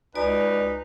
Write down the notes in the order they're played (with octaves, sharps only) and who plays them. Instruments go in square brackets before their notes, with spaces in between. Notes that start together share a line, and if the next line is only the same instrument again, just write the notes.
[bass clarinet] C#2 [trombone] D#4 [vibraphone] F#4 D5 G#5 [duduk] B4